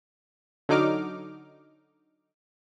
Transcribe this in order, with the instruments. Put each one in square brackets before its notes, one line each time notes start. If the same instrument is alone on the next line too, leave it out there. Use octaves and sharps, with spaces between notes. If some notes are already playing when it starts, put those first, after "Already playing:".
[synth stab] D3 F#3 D#4 D6 F6